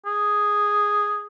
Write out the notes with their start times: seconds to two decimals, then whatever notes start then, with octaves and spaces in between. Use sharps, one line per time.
0.06 G#4